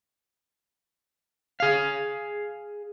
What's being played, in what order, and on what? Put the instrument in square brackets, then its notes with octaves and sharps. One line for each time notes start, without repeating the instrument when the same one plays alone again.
[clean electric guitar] G#4 F5